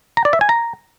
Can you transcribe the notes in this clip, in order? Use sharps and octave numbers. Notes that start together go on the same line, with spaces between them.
A#5
D5
E5
G#5
A#5